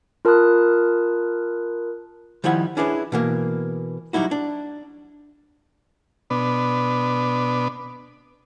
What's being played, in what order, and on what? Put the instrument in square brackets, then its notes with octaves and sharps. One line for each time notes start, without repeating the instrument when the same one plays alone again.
[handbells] F4 A#4 A5 B5 D#6 F#6
[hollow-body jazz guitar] D#3 F3 G3 E4 F#5 G#5
C#4 D4 E4 G#4 B4
B2 E3 A#3
F#3 G3 D#4 E4 F#4
D4
[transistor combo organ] B2 B3 D4